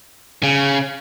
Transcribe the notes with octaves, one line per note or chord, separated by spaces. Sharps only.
C#3